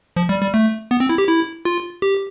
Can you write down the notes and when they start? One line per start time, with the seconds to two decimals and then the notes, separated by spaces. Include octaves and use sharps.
0.17 F3
0.29 G3
0.41 G3
0.54 A3
0.91 B3
1.00 C4
1.09 E4
1.18 G4
1.28 E4
1.65 F4
2.02 G4